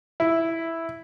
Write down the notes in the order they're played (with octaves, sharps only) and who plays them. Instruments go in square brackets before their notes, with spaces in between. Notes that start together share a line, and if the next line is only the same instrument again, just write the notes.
[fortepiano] E4